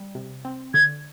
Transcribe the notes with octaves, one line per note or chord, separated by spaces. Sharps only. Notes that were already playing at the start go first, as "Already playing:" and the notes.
Already playing: G3
C3
C4
D3 G#6